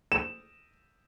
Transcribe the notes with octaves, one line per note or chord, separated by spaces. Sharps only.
E7